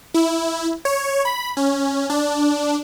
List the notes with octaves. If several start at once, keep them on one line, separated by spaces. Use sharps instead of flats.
E4
C#5
B5
C#4
D4